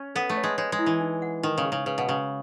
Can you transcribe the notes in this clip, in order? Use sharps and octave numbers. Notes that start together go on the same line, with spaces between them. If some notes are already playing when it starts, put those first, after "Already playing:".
Already playing: C#4
B3 A4
A3
C#5
G#3
G#3 C#5
G#3
E4
E3
D#4
F#5
D#3 D#4
C#3
G#4
C#3
C#3 B4
B2
C#3 F#4